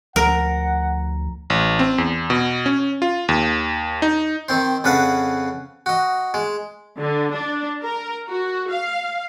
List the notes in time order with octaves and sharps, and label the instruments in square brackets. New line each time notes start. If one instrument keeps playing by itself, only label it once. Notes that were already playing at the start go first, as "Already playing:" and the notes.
[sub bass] D2 [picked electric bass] F3 [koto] A#4 [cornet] F#5
[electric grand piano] A1
C4
E2
B2
C#4
F4
D#2
D#4
[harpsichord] D#3 C4 C5
F2 C#3 B4 F5 F#5 A5
F#4 D#5
G#3
[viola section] D3
D4
A#4
F#4
F5